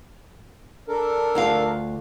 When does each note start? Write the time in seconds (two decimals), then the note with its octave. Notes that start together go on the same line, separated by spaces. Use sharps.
0.88 D4 A4 A#4
1.35 D2 F4 F5